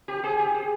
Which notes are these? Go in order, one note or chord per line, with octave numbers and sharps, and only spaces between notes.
G4
G#4
G4
G#4